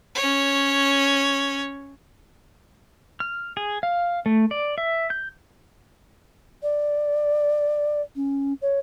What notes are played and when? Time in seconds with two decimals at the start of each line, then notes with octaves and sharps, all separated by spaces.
0.15 C#4 C#5
3.20 F6
3.57 G#4
3.83 F5
4.26 A3
4.51 D5
4.78 E5
5.10 G6
6.62 D5
8.15 C#4
8.61 C#5